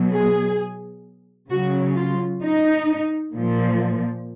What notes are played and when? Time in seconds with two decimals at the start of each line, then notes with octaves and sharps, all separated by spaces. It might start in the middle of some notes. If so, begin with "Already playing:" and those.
Already playing: B2 F#3
0.12 G#4
1.50 C#3 F#3 F#4
1.96 F4
2.42 D#4
3.33 A#2 F3